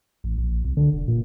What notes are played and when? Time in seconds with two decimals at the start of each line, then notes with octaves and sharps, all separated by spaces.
0.24 A1
0.38 A#1
0.64 C2
0.77 D3
0.93 E1
1.08 A#2